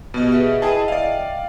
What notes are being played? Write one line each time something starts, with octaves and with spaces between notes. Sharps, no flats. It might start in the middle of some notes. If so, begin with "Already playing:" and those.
B2 B3 F#4 G4 D#5
G#4 B4 E5
E4 G#4 D#5 E5 G5 A5
D5 F5